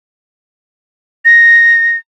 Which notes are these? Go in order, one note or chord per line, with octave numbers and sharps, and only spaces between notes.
A#6